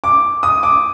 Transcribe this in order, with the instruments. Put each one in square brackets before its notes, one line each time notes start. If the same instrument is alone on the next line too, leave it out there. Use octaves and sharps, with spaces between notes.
[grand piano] D6
D#6
D6